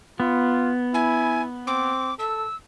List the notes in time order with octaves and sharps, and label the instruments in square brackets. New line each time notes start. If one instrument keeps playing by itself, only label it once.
[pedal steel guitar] B3 [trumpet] F4
[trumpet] E4 [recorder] G#5
[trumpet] C4 [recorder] D6
[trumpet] A4 [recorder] E6